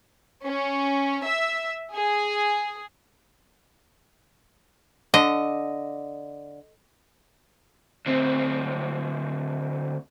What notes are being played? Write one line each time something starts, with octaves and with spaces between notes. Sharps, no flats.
C#4
E5
G#4
D3 D#5
D2 C4